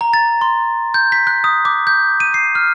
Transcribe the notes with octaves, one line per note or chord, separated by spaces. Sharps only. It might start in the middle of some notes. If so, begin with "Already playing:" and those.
A#5
A6
C6
G6
B6
F#6
D#6
D6
G6
D#7
C7
F6